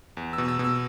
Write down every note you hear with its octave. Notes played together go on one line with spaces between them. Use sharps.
E2
E6
B2
E6
B2
E6